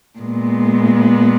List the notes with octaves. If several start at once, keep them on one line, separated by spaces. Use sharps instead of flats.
A#2 G#3 B3